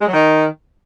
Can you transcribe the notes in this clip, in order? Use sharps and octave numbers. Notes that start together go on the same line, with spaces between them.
G#3
F#3
D#3